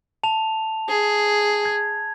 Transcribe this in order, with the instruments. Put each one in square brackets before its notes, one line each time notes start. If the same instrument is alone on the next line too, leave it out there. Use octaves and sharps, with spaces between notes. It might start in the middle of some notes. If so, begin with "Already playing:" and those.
[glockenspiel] A5 F7
[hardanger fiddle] G#4
[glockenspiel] G#6